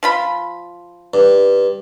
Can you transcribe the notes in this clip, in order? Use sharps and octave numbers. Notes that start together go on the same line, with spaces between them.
F3 F4 B5
G2